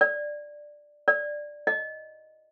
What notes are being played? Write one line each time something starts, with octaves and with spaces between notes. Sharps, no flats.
D5
D5
D#5